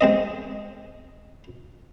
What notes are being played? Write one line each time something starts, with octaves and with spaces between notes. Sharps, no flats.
G#3 C4 D#5